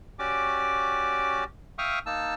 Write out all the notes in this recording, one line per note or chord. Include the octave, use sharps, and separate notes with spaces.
C#4 F#4 G4 D5 D6
E5 F5 G5 C#6 D#6 F6
A#3 D#4 A5 E6